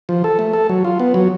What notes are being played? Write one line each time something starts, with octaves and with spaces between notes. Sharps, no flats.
F3
A4
A3
A4
F#3
F4
B3
F#3